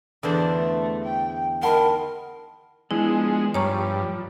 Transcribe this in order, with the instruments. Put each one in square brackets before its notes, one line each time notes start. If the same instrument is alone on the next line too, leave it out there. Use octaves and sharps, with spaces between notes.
[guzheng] E2 D3 C5 [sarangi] D4
[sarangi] A3
G5
[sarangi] D#3 [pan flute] A#4 [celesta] F#5 A5 B5 [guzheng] C6
[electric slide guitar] F3 B3 D4 [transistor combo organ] G#3 [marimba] E4
[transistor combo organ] G2 [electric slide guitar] F3 [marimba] C#5 A#5 C#6